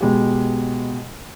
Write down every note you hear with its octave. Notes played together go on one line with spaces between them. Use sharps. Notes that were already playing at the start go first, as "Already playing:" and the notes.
B2 G#3 G4